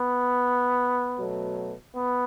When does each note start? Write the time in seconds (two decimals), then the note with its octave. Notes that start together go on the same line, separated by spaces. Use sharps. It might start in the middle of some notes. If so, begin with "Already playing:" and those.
Already playing: B3
1.18 B2 F#3 A3
1.96 B3